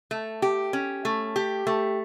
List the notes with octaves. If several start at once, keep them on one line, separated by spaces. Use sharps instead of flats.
A3
G4
C#4
A3
G4
A3